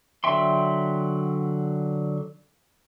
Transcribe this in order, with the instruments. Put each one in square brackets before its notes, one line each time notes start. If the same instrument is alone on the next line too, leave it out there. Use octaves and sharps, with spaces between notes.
[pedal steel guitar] D3 F#3 E5 G5 C6